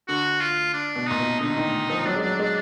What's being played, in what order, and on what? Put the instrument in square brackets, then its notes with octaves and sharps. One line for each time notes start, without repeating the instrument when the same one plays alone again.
[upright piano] D3 [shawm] F#4
[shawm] F4
D4
[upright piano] B2
[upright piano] A#2 [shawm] D#4
[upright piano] B2
[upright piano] D3 [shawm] D#4
[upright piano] D#3
F3
[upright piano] F#3 [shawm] D4
[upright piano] G#3
F#3
G#3